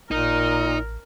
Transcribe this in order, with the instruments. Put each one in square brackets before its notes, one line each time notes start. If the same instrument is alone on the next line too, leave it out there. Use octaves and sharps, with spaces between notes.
[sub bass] A1 [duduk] A#2 [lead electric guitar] D#4 [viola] A#4